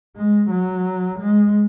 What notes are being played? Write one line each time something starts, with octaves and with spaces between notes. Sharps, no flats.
G#3
F#3
G#3